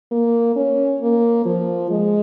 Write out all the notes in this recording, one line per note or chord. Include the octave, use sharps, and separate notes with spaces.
A#3
C#4
A#3
F3
G#3